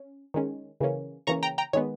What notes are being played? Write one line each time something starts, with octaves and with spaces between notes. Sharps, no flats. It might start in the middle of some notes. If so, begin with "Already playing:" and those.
Already playing: C#4
D#3 G#3 C#4
C#3 E3 A#3 C#4
C#3 E3 A#3 C#4 A#5 C#6
G5 A#5
G5 A#5
D#3 G#3 B3 C#5